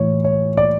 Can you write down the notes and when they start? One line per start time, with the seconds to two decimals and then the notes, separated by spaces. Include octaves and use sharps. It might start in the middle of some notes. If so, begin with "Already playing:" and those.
Already playing: A2 E3 C#5
0.24 C#5
0.57 D5